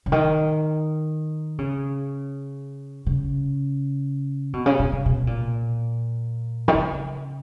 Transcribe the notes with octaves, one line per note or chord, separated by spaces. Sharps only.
C#3
D#3
C#3
C#3
B2
C#3
B2
C#3
B2
A#2
D#3
C#3